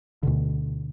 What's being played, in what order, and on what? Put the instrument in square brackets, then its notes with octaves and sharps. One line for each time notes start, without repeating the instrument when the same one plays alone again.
[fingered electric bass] D2 B2 D3